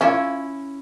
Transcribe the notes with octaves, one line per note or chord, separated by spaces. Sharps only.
C#4 E4 F4